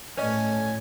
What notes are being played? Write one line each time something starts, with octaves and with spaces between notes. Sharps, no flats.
A2 A3 C#4 B4 D5 D#5 G#5